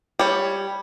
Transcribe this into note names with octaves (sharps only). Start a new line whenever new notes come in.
G3 C#5